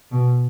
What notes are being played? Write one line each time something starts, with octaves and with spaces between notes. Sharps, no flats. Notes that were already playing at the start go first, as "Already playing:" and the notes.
B2